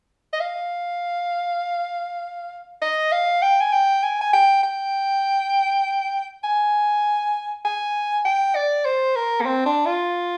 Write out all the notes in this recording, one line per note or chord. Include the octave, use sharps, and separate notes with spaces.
D#5
F5
D#5
F5
G5
G#5
G5
G#5
G#5
G5
G5
G#5
G#5
G5
D5
C5
A#4
A#3
C4
D4
F4